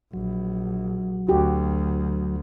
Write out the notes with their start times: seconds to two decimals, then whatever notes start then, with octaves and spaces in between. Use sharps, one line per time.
0.13 A#1 F#3
1.28 D2 F#4 G4